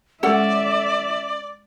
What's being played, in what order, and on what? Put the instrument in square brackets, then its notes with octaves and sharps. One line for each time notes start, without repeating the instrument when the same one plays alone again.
[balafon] G#3 A#4 [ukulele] C#4 A4 F#5 [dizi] D5 [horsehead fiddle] E5